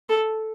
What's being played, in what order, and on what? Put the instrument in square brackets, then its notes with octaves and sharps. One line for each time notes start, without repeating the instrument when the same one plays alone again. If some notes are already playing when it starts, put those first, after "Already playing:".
[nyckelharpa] A4